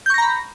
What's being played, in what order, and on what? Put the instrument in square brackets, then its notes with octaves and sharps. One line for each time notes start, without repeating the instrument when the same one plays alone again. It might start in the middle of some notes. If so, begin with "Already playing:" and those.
[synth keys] G6
C#6
A#6
A#5
B5